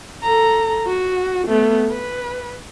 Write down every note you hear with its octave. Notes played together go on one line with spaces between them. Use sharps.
A4 A#5
F#4
A3 B3
B4